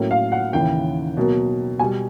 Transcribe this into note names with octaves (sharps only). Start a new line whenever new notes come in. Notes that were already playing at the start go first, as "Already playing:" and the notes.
Already playing: A2 F#3 A#3 C#4
F5
F#5
D#2 C#3 E3 G5
B2 F#3 A#3
B2 G3 B3 G#5